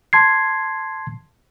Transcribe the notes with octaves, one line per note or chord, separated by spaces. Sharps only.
A5 C6 G#6 C7